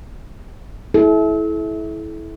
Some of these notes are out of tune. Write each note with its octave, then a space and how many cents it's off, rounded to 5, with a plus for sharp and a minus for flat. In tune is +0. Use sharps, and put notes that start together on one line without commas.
E4 -15 A4 -40